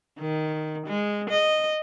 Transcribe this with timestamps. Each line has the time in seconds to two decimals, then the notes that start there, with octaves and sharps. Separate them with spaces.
0.19 D#3
0.87 G#3
1.29 D#5